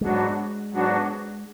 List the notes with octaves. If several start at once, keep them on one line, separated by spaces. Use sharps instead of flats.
G#2 F#3 G#3 B3 D4 F#4
G#2 F#3 B3 D4 F#4